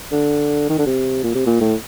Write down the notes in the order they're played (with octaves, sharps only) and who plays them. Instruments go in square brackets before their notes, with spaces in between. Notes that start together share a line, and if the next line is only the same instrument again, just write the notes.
[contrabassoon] D3
D#3
D3
C3
A#2
C3
A#2
A2